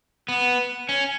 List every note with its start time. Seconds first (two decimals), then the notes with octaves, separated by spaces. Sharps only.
0.29 B3
0.89 C#4